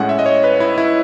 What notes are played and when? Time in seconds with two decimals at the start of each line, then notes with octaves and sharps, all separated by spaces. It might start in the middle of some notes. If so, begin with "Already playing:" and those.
Already playing: A2 G#3 C#4 F#5
0.09 E5
0.19 D#5
0.26 C#5
0.44 B4
0.60 E4
0.78 E4